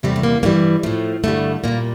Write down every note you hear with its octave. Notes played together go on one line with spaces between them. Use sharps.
E2 C3 G3 A3 C4
A3
A#3
G2 E3 G3 A#3
A2 F3 A3
G2 D3 G3 A3
A#2 G3 A#3